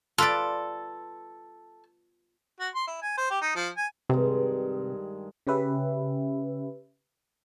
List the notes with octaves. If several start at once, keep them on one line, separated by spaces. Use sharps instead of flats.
F4 A4 B4 D5
F#4
C6
E4
G#5
C5
G4
D#4
F3
G#5
G2 C3 D#3 G#3
C#3 C#4 G4 B4 E5